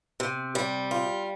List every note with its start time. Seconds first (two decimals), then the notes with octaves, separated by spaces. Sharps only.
0.20 C3
0.55 G3
0.91 F4